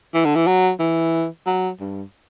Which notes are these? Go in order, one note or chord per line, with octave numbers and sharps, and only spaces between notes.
E3
D3
E3
F#3
E3
F#3
G2